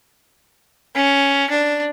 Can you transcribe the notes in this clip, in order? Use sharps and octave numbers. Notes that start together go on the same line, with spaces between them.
C#4
D4